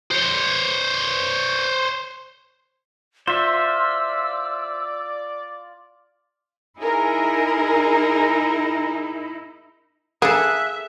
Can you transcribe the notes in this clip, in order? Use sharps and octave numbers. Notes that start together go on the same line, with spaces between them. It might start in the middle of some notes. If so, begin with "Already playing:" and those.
C5 C#5
F4 C5 D5 E5 E6
D#4 E4 G#4 A#4
A#3 G#4 A4 E5 F#6